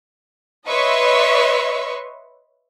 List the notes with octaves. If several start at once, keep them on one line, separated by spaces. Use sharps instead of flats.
B4 C#5 D#5 E5 C6 C#6